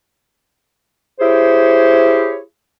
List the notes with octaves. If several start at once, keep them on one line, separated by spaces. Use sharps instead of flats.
E4 G4 G#4 C5 C#5